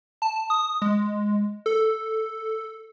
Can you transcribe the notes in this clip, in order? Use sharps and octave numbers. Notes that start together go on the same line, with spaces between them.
A5
D#6
G#3
A4